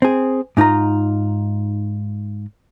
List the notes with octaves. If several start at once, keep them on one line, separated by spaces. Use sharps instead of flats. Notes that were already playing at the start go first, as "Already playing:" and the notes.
C4 G#4
G#2 D#4 F4 A#5